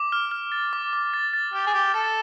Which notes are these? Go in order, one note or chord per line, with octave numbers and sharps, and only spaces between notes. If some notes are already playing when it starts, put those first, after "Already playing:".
Already playing: D6
F6
F6
A6
D6
D6
A6
A6
G4 F6
G#4
G4 D6
A4 A6